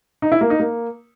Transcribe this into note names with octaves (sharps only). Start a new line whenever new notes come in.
D#4
E4
A#3
D#4
A#3